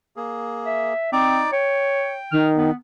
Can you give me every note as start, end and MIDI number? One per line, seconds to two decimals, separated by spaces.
0.16 0.93 58
0.16 0.93 68
0.66 1.10 76
1.13 1.40 60
1.13 1.51 63
1.13 1.51 74
1.13 1.51 86
1.53 2.17 73
1.53 2.41 79
2.32 2.70 51
2.32 2.47 89
2.56 2.74 59